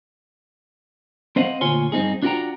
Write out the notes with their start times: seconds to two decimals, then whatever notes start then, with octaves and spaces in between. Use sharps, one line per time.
1.36 C4 C5 D#5 F5 F#5
1.61 D2 A#2 F4 C#5 G#5 C6
1.92 G2 C4 D#4 G#4
2.22 D4 F4 F#4 A#4 G5 A#5